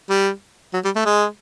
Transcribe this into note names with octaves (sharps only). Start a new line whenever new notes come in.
G3
F#3
G3
A3
G#3